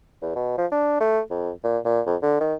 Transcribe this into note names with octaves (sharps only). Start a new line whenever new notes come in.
E2
B2
F3
D4
A3
F2
A#2
A#2
F2
D3
D#3